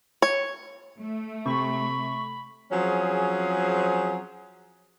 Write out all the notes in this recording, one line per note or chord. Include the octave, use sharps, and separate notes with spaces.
C#5
A3
C3 B5 C#6
F3 F#3 C4 C#4 G#4